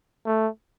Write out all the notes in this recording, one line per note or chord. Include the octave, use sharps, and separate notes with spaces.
A3